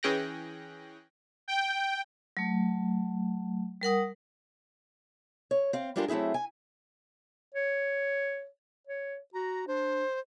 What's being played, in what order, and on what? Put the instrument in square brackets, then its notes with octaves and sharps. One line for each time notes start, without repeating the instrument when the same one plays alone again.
[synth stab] E3 C#4 G#4 G5 F#6 A#6
[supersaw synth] G5
[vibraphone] F#3 A3
G3 A#4 F#5 D#6
[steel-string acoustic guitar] C#5
C4 F5
G3 G#3 D4 F4 G4 A#4
F#3 A3 C4 E4 G#4
G#5
[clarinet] C#5
C#5
[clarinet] F#4 [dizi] A#5
[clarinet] D4 [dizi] C5